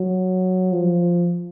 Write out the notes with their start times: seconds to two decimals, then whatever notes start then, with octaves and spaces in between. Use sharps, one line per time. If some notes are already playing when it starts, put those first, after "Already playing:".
Already playing: F#3
0.72 F3